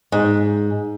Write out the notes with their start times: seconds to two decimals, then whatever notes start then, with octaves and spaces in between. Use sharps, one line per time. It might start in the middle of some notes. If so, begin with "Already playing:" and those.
0.12 G#2